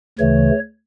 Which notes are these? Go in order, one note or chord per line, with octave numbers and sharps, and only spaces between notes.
D2 C#3 E3 A3 C#5